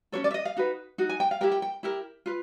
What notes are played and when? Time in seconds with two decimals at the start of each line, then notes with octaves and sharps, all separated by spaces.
0.12 C#4 F4 A4 C#5
0.24 D5
0.31 E5
0.34 D#5
0.45 F5
0.57 D#4 F#4 B4
0.98 D#4 F#4
1.09 G#5
1.20 G5
1.31 F5
1.41 E4 G4 A#4 G5
1.52 G5
1.62 G5
1.83 E4 G4 A#4
2.26 F4 B4